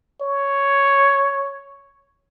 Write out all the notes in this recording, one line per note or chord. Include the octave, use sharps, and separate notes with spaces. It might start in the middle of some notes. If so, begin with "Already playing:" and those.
C#5